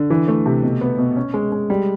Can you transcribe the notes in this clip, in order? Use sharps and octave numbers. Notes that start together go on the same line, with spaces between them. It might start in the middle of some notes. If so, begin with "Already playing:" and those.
Already playing: D3
E3
A3
C3
B2
B3
B2
C#4
G#3
G#3
G3